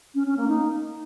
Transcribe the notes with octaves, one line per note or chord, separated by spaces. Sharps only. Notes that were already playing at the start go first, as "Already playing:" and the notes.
C#4
C#4
A#3
D#4